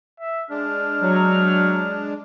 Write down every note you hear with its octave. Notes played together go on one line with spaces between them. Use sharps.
E5
G#3 D4 F6
F#3